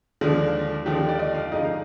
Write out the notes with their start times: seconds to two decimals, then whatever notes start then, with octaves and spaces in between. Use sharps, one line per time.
0.21 D#2 D3 F3 G#3 D4
0.86 D#2 D3 F3 G#3 D4 G4
1.09 D5
1.19 D#5
1.35 F5
1.52 D3 F3 G#3 D#4 D#5
1.65 F5